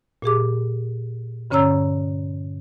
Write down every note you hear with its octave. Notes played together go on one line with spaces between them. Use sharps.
A#2 G4 G#4 D6
G2 D3 C#4 C#5 A#5 E6